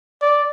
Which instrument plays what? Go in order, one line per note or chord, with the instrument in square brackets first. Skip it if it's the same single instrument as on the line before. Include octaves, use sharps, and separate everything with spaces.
[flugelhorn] D5